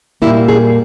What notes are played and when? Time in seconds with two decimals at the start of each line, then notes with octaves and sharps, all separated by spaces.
0.22 A#2 G3 A#3 E4
0.48 G#4